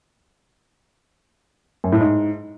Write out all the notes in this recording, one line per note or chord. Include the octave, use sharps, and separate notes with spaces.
F#2
A2
G#2